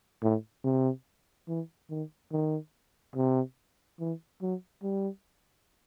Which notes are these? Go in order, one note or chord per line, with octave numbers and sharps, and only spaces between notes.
A2
C3
E3
D#3
D#3
C3
E3
F#3
G3